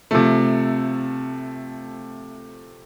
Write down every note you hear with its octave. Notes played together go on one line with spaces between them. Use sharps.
C3 F3 A3